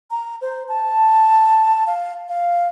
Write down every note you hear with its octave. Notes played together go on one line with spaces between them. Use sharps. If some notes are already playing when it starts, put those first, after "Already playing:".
A#5
C5
A5
F5
F5